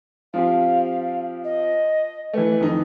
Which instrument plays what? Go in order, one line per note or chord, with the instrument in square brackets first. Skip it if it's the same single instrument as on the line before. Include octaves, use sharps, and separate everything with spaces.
[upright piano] F3 C4 G4 [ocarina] F5
[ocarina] D#5
[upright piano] E3 A3 [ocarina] B4
[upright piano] F2 D#3 D#4